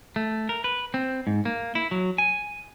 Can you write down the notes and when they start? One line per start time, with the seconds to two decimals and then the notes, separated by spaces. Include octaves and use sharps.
0.16 A3
0.49 A#4
0.64 B4
0.94 C4
1.27 G#2
1.45 A#3
1.75 E4
1.91 F#3
2.18 G#5